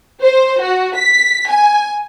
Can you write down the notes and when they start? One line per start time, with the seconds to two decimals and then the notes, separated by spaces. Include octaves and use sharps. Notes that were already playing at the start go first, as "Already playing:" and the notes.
0.21 C5
0.62 F#4
0.96 B6
1.49 G#5